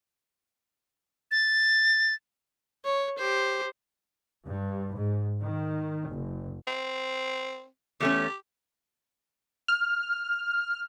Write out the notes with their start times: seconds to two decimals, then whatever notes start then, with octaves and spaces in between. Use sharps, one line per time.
1.31 A6
2.85 C#5
3.18 G4 C5
4.45 G2
4.95 G#2
5.42 D#3
6.09 F#1
6.67 C4
8.00 E2 A3 C#4 G4
9.68 F6